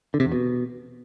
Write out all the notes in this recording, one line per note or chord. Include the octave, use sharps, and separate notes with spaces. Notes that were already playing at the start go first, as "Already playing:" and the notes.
D3
C3
E2
B2